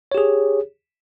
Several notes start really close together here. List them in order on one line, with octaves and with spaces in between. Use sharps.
C#5 G4 G#4